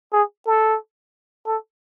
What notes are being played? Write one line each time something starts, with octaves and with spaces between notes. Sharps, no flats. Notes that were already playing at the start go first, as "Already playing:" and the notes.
G#4
A4
A4